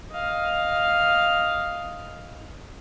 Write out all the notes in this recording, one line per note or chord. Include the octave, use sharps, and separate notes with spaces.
D#5 F5